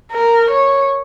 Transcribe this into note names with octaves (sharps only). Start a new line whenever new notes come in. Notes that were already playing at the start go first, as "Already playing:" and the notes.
A#4
C#5